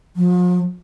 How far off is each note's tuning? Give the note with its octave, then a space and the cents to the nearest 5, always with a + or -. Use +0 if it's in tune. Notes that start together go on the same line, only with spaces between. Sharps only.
F3 +45